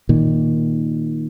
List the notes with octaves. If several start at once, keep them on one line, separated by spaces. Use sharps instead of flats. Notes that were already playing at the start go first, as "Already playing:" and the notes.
A#2 D#3